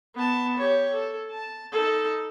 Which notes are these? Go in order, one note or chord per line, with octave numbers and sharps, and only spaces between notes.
B3 A5
G4 C#5
A4
A5
D#4 A4